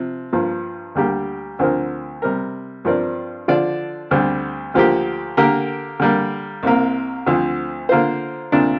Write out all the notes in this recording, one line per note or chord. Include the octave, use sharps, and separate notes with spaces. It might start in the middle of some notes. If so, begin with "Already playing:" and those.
Already playing: C3 F3
G2 F3 A#3
D2 D3 G3 A#3 G4
D2 D3 F3 C4 A#4
C3 G3 C4 A#4
G2 F3 C4 A#4 D5
D3 F3 D4 F4 D5
D2 D3 G3 C4
D2 D3 F3 A#3 G4
D3 A#3 G4 A#4
D3 G3 A#3
C2 C3 A#3
D2 D3 F3 C4
D3 A#3 F4 C5
D2 C3 A#3 D4 F4